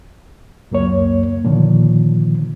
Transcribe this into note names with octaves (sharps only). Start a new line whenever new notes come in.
C#2 F#2 A#3 C#5
A#2 D3 D#3 F3